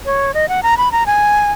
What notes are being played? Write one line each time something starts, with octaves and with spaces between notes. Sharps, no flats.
C#5
D#5
F#5
A#5
B5
A#5
G#5